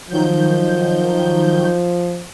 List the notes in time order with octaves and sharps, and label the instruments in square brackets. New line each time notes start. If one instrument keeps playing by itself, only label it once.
[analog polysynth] D#3 F#3 G6 [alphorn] F3